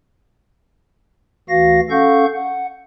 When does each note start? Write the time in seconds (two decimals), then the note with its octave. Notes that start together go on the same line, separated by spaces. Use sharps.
1.49 D2 E3 F#4 F5 A#6
1.90 C#4 A4 F5 F#5 C#6 G6
2.33 F#5